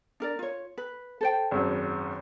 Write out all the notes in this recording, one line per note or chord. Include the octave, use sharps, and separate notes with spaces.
D4 A#4 D5
F4 C#5
B4
A4 C5 G5
G#1 F#2